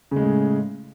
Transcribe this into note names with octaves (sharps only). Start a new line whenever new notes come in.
A2 C#3 G#3